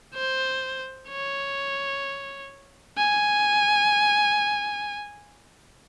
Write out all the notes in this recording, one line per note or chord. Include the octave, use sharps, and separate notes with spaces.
C5
C#5
G#5